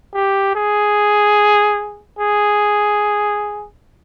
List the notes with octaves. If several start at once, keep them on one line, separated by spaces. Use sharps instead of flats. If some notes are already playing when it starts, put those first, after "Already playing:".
G4
G#4
G#4